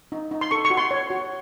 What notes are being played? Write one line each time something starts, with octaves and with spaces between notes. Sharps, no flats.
D#4
D#4
C6
A4 C#6
C#6
F#4
C6
C#5
F#4